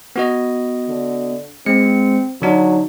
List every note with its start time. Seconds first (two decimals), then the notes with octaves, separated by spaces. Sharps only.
0.16 B3 F#4 D#5
0.89 D3
1.66 G#3 C4 C#7
2.42 D3 F#3 D4 D#4